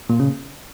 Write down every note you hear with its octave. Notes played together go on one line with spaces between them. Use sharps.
A#2
C#3